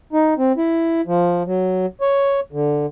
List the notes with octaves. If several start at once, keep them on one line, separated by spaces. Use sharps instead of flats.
D#4
C4
E4
F3
F#3
C#5
D3